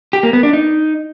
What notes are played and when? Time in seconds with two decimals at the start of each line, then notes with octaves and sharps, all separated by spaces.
0.13 G4
0.23 A#3
0.33 B3
0.43 D4
0.53 D#4